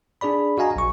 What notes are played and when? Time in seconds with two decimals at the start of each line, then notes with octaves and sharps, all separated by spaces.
0.21 D4 G#4 D5 B5
0.58 F#4 D#5 F5 G#5 A#5
0.76 A#1 C#6